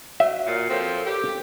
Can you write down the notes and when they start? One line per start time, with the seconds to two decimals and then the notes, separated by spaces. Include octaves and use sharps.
0.20 F#4 C#5 E5 F#5
0.47 A#2 F#4 C7
0.69 F3 C4 A4 A#4 C#5
1.06 G4